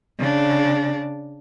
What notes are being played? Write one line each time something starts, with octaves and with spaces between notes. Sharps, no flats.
C#3 D4